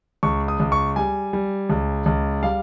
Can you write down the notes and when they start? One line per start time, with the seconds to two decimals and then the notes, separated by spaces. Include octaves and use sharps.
0.23 C#2 C#6
0.48 D#6
0.60 C#2
0.72 C#6
0.96 G3 G#5
1.33 G3
1.69 C#2
2.06 C#2
2.42 G3 F5